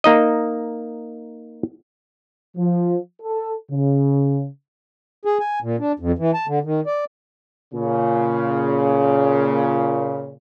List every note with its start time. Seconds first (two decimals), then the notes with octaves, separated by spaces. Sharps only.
0.04 A#3 D#4 D#5
2.57 F3
3.22 A4
3.71 C#3
5.25 G#4
5.40 G#5
5.62 A#2
5.79 D4
6.00 F2
6.18 E3
6.34 A5
6.47 D3
6.64 D#3
6.86 D5
7.74 A#2 C#3